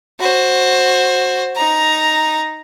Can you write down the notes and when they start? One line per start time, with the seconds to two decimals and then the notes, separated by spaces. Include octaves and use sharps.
0.20 F#4 C5
1.56 D#4 A#5